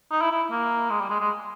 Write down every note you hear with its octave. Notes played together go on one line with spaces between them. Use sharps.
D#4
E4
E4
A#3
G#3
G3
G#3
G#3